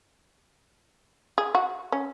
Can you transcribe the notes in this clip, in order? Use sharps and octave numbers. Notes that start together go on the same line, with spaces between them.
G#4
F#4
C#4